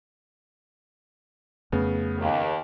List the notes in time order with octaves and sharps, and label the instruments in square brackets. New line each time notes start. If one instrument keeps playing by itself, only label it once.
[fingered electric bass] F2 A3 C#4 [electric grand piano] C#3 B3
[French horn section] D#2